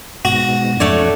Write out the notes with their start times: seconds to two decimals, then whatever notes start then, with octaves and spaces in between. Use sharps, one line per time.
0.25 G#2 B2 F#4 A#6
0.80 F2 A3 D4 C#5 D5